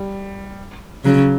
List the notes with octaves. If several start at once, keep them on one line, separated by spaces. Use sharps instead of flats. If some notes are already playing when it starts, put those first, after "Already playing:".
Already playing: G3
C#3 F#3